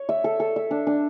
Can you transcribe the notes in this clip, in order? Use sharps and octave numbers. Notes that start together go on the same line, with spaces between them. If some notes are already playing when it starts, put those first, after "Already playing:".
Already playing: C#5
E5
A4
A4
E5
D4
D4